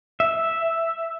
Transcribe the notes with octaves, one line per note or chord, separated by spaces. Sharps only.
E5